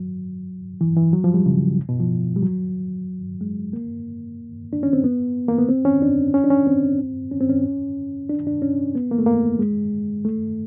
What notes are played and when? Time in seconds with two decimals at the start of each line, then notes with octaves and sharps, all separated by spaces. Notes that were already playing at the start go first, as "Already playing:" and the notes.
Already playing: F#3
0.81 E3
0.97 E3
1.13 F#3
1.24 F3
1.34 G3
1.46 C#3
1.89 B2
2.00 F3
2.36 G3
2.43 F#3
3.41 G#3
3.73 A#3
4.73 D4
4.83 C#4
4.93 C4
5.04 B3
5.48 A#3
5.58 B3
5.69 C4
5.85 C#4
6.02 D4
6.34 C#4
6.44 D4
6.50 C#4
6.67 C4
7.31 C#4
7.41 C4
7.49 C#4
8.29 D4
8.47 D4
8.62 C#4
8.95 B3
9.11 A#3
9.18 A3
9.26 A#3
9.59 G#3
10.25 A3